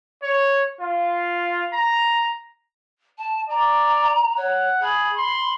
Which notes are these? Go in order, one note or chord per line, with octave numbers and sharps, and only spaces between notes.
C#5
F4
A#5
A5
D5 A#5
C#5 F#5
G#4 B5
C6